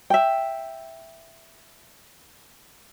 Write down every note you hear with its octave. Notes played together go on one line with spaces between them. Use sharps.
E5 G5